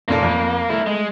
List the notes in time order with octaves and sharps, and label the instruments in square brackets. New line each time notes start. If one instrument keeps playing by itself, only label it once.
[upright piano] F1 A#2 A4 [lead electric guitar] A#3
[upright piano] F2
[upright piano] A3 [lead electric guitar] E4 A#4
[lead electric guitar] G#3